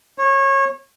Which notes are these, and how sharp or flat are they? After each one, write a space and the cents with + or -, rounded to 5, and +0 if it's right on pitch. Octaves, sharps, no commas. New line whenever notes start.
C#5 -25